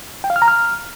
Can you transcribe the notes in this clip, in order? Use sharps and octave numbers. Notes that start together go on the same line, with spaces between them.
G5
F5
F6
A#5
F6